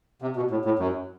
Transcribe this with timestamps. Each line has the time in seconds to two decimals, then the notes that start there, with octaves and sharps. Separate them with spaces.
0.22 C3
0.36 B2
0.51 A2
0.65 A2
0.79 F#2